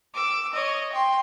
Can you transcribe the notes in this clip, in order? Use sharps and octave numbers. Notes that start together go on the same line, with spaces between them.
D6 E6
C#5 D#5
G5 C6